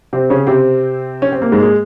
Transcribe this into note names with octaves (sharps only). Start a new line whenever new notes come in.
C3 C4
C#3 C#4
C3 C4
C#4
C4
A#3
G#2 G#3
A#3
G#3